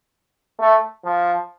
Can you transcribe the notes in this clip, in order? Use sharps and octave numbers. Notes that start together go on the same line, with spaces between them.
A3
F3